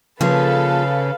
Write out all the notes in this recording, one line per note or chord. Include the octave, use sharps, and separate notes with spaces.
C#3 F3 A#3 G#4 A4 B4 F5